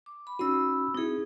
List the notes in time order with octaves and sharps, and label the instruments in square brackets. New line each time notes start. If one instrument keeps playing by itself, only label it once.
[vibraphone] D6
B5
[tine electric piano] C#4 D#4 F#4 [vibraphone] B5 E6
[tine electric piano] C4 E4 [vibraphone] D#4 G#4